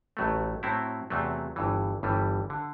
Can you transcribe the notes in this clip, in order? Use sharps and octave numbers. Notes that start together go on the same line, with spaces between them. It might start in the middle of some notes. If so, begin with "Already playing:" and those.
A1 A2 F#3 A3
A2 F#3 C4 E4
E2 C3 F#3 A3
G1 G2 E3
G1 G2 E3 G3
D3